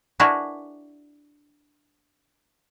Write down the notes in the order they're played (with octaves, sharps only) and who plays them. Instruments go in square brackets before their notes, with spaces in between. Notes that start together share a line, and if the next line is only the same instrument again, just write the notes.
[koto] D4 E4 F#4 G#4 A#4 B4